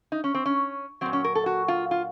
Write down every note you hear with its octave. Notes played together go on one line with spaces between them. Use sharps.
D#4
C#4
C4
C#4
A#2 F#3 C4
C#4
A#4
A4
F#4
F4
F4